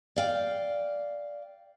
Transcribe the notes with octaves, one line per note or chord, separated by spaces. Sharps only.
D5 F5 G5